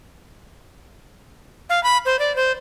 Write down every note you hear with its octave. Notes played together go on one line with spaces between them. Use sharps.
F5
B5
C5
D5
C5